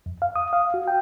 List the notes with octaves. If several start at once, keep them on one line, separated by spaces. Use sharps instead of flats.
F2
F5
D#6
F5
F#4
G5